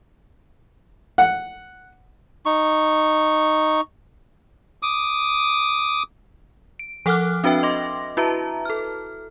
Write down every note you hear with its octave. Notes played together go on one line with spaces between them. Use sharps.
F#5
D#4 C#6
D6 D#6
D7
F3 A4 F#5 D6 F6 F#6
C4 D4 F#4 B4 E5 G5
D#5 C6 D6 A#6
E4 F#4 B4 E5 A5 A#5
A4 F6